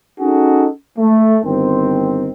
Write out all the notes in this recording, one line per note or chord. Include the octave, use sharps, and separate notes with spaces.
C#4 D#4 F#4 G#4 A4
A3
G1 D#3 C4